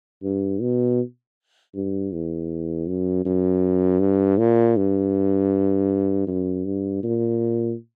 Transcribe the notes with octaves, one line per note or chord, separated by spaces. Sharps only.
G2
B2
G2
E2
F#2
F#2
G2
A#2
G2
F#2
G2
A#2